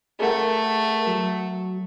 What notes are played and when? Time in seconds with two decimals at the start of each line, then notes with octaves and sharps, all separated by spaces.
0.20 A3 G#4 A#4 F#5
1.07 F#3